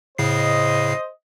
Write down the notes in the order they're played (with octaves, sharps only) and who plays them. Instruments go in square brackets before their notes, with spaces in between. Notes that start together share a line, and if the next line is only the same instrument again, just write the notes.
[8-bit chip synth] A2 C#3 C7 [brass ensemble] C5 D#5